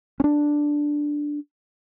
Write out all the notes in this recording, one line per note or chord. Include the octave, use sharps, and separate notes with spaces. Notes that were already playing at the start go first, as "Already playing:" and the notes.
C#4 D4